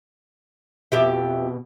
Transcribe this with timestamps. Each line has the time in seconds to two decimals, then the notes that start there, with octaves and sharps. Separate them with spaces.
0.92 F2 B2 G4 E5